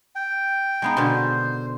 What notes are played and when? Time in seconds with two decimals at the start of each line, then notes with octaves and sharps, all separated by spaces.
0.15 G5
0.82 G#3 B3 D#4
0.97 B2 D3 C5